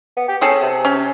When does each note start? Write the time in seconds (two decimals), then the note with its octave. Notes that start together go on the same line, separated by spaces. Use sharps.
0.17 B3
0.29 G4
0.41 C4 C#4 G#4 A4
0.62 C3
0.85 C#4